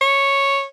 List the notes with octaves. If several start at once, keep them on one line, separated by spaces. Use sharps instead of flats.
C#5